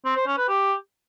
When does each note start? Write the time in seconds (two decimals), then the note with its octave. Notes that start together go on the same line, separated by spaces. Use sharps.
0.05 C4
0.16 C5
0.27 C#4
0.37 B4
0.48 G4